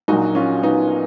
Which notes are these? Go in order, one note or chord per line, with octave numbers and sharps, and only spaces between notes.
A#1 A#2 F#3 D#4 F#4
C#4 F4
B3 D#4